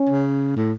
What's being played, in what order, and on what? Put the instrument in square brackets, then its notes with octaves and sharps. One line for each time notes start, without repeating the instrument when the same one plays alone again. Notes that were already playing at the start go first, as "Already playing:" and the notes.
Already playing: [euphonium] C#4
[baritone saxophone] C#3
A2